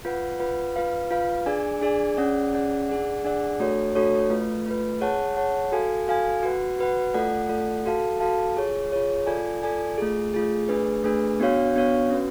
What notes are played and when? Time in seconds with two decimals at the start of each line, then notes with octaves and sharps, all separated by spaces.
0.05 F4 B4 F#5
0.39 F4 B4 F#5
0.76 F4 B4 F5
1.11 F4 B4 F5
1.46 D4 G#4 D5 G#5
1.81 D4 G#4 D5 G#5
2.17 C#4 G#4 D5 F#5
2.53 C#4 G#4 D5 F#5
2.88 D4 G#4 D5 F#5
3.24 D4 G#4 D5 F#5
3.60 A3 D4 F#4 A4 C#5
3.95 A3 D4 F#4 A4 C#5
4.30 A3 F4 B4
4.66 A3 F4 B4
5.01 G#4 C#5 F#5 A5
5.37 G#4 C#5 F#5 A5
5.72 F#4 A4 F5 G#5
6.08 F#4 A4 F5 G#5
6.43 F#4 B4 F#5
6.79 F#4 B4 F#5
7.14 A3 F4 A4 D5 F#5
7.49 A3 F4 A4 D5 F#5
7.86 F#4 A4 F5 A5
8.20 F#4 A4 F5 A5
8.57 F4 G#4 C#5
8.92 F4 G#4 C#5
9.27 F4 A4 D5 G#5
9.63 F4 A4 D5 G#5
9.98 A3 F4 G#4
10.34 A3 F4 G#4
10.69 A3 D4 G#4 B4
11.04 A3 D4 G#4 B4
11.40 B3 D4 F#4 C#5 F5
11.75 B3 D4 F#4 C#5 F5
12.10 C#4 F#4 B4